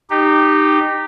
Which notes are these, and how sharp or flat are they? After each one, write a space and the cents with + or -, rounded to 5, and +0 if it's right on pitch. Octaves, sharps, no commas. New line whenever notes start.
D#4 -20 G4 +0